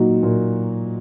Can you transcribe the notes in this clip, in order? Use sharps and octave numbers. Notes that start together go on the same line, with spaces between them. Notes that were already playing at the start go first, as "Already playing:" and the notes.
Already playing: A#2 F#3 A#3 D#4 F#4
A#2